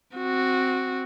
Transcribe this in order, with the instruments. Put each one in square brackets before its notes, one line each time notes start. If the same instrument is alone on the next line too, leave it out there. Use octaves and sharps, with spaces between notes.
[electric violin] C4 F#4